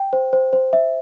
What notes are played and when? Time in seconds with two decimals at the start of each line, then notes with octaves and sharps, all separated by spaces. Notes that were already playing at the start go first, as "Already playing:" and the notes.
Already playing: G5
0.13 C5
0.33 C5
0.53 C5
0.73 E5